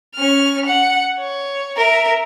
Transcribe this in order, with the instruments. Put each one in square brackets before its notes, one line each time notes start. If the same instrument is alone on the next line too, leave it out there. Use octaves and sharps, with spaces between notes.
[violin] C#4 F6
F#5
C#5
A#4 E5